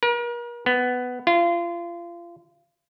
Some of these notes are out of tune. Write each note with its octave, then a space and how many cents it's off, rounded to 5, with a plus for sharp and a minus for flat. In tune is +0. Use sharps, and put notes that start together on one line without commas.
A#4 +40
B3 +10
F4 -30